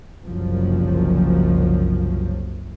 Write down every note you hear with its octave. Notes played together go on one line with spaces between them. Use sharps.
F#1 C2 F#2 F3 F#3